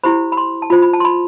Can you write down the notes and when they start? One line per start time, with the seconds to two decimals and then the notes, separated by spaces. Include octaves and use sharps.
0.04 E4 G4 C5 B5
0.32 B5
0.37 C6
0.62 A5
0.70 F4 C5 B5
0.82 B5
0.93 A5
1.00 C6
1.05 B5